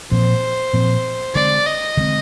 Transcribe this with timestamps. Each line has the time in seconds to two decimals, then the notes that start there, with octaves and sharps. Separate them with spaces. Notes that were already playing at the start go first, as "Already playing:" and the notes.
0.11 A#2 F3 C4 C5
0.73 A#2 F3 C4
1.35 D3 G#3 C4 D5
1.66 D#5
1.97 D3 G#3 C4